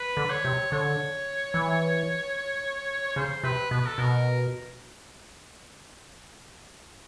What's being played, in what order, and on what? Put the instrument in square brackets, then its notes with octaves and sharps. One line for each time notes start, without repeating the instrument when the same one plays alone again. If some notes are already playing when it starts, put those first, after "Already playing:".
Already playing: [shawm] B4
[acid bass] D3
[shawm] C#5
[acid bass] C3
[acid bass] D3 [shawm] C#5
[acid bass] E3
[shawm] C#5
[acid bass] C#3 [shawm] C5
[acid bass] C3 [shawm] B4
[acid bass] B2 [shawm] B4
[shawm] A4
[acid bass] B2 [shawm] A#4